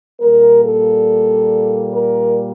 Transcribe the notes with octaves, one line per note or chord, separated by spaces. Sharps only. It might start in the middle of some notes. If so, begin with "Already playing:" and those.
A#2 G3 A#3 A#4
A4
A#4